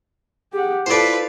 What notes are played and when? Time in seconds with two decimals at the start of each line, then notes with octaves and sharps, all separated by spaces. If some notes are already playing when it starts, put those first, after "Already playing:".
0.53 G4 G#4 F#5
0.86 E4 F4 A4 B4 C5 D5